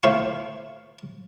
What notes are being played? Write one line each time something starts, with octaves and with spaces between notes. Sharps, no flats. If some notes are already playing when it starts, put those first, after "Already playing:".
A2 C5 E5 F5 C#6